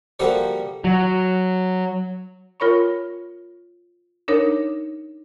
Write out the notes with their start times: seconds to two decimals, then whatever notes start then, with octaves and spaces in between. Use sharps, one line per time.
0.19 F3 G3 A#3 F#4 A4 C5
0.84 F#3
2.60 F4 A#4 C#5 B5 C#6
4.28 D4 D#4 A#4 C#5